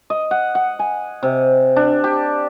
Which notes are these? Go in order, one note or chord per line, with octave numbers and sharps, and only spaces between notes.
D#5
F#5
F#5
G#5
C3
D4
G4